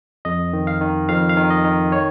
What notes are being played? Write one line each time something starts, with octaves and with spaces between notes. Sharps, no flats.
F2 D#5
D#3
F5
D#3
F2 F5
F5
D#3
D#5
D#3
C#5